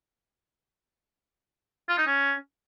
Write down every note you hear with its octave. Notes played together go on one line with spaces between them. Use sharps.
F4
D#4
C#4